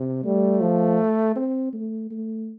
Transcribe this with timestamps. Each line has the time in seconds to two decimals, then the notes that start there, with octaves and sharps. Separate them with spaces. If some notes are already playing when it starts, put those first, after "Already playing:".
Already playing: C3
0.24 G3 A3
0.61 F3
1.36 C4
1.73 A3
2.11 A3